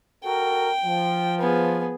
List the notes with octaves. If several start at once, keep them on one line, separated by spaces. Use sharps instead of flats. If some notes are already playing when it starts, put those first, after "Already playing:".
F#4 A4 A#4 G5
F3
B3 G#4